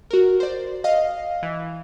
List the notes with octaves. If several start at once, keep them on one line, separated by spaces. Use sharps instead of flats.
F#4 A#4
C5 D5
D#5 F5
E3